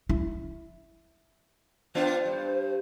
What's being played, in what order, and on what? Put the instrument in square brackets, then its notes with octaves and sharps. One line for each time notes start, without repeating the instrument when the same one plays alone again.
[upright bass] E4
[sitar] B3 D4 F4 [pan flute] C5
[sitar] G2